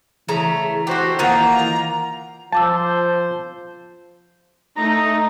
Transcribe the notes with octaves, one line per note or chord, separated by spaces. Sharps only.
C#3 E3 A3 A#5
F#4 G4 A4 C5
D#3 A#3 F4 F#5 A#5
F3 C5 F5 A5 D6 E6
A3 D#4 A#5